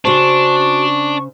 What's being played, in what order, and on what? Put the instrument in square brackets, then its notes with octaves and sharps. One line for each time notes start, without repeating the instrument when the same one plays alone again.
[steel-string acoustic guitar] C#3 C5 [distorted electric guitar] D4 [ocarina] F#4 [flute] C#6